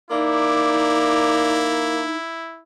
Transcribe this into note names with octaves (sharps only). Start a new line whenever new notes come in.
A#3 D#4 E4 D5